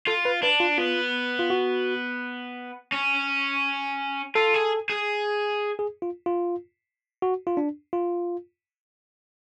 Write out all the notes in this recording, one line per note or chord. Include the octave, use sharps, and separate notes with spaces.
F4 A4
B4
D4 B4
F4
B3 F4
F4
F#4
C#4
F4 A4
G#4
G#4
G#4
F4
F4
F#4
F4
D4
F4